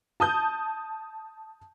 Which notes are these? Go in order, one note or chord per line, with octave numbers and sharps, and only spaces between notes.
A5 D#6 G6